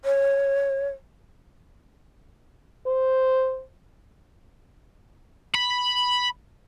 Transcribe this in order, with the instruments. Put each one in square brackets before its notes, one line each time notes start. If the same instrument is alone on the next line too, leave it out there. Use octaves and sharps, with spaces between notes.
[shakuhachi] C#5
[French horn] C5
[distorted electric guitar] B5